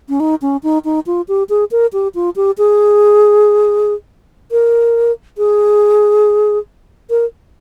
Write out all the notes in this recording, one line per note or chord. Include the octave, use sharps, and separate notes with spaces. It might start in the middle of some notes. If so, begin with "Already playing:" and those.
C#4
D#4
C#4
D#4
D#4
F4
G4
G#4
A#4
G4
F4
G4
G#4
A#4
G#4
A#4